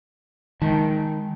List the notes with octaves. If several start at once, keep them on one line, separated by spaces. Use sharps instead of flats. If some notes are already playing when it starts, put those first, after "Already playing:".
D#3 G#3 A5